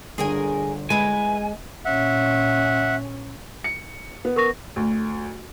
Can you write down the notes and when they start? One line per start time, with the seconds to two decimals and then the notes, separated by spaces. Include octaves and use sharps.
0.18 G1 D3 G#4 A#4 G#5
0.90 G#3 E4 B4 G#5
1.85 A#2 C#4 E5 F#5
3.64 C#7
4.25 B3
4.36 A#4 C#6 A#6
4.76 D2